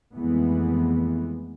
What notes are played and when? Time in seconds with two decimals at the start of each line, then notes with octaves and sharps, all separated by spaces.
0.16 F2 E3 G#3 A3 B3